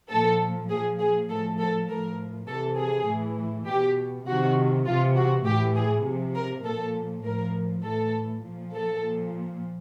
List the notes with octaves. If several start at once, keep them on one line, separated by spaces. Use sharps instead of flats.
A#2 F3 A4
A#2 F3 G#4
G#4
A2 F3 A4
A4
A2 F3 A#4
C3 E3 A4
G#4
A2 E3
B2 G4
C3 D#3 F#4
C3 E3 F4
F#4
A2 E3 G4
G#4
C3 F3
A#4
A#2 F3 A4
A2 F3 A#4
A2 E3 A4
A#2 F3
A4
A#2 F3